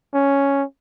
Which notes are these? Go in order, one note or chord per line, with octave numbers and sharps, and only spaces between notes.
C#4